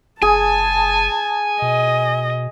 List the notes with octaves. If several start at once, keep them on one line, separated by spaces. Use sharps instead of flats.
F#1 G#4 G#5 A5
B2 D#5